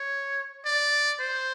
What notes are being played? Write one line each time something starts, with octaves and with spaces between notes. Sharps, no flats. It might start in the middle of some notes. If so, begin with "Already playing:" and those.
Already playing: C#5
D5
C5